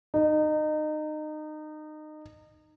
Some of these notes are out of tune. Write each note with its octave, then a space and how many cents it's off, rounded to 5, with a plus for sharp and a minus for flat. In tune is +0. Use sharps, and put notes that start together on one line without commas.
D#4 -25